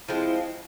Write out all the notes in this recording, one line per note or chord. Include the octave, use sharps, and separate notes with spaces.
F3 G#3 C4 E4